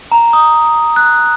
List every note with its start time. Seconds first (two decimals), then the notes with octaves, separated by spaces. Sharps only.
0.12 A#5
0.33 D#6
0.96 F#6